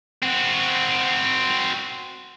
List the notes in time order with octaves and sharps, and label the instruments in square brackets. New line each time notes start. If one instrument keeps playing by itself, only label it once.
[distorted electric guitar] C4 F#4